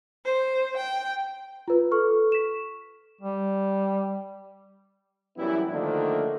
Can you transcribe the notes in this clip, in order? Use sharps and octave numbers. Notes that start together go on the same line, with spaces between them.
C5
G5
F4 B4
A4 C#6 F6
B6 E7
G3
F#2 E3 G3 B3 E4
D3 D#3 F3 A3 A#3 D4